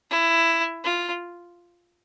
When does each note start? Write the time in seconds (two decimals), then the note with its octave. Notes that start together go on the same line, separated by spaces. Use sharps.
0.10 E4
0.84 F4